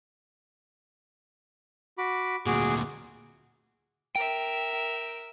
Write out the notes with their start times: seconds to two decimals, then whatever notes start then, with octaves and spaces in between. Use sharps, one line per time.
1.98 F#4 B5 D6
2.46 D2 A#2 F#4 G#4 D6
4.16 A#4 E5 G5